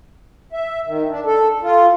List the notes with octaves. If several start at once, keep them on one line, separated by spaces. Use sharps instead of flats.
E5
D#3
D4
A4
F4